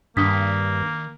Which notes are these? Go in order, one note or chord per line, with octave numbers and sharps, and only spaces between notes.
G2 D#3 A#3 D4 C6 D#6 B6